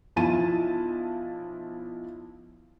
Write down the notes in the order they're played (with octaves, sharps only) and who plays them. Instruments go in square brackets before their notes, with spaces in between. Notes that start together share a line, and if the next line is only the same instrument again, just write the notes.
[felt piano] B1 F3 E4 A5 D#7